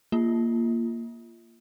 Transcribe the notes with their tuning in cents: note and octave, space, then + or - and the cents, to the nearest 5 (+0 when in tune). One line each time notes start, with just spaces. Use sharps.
A#3 +0 F4 -20